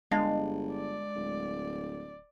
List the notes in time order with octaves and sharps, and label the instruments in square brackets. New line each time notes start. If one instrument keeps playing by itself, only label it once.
[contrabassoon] G1 [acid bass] G#3 [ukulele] D4 F5
[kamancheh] D5
[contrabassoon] D1